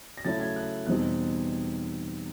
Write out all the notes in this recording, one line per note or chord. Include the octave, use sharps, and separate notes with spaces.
A#6
C#3 F#3 A3 C#4 E4 A6
G#6
F#6
E2 B2 G3 C4 D#4 F#6